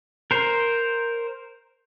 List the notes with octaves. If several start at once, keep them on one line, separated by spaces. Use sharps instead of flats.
A#4 C5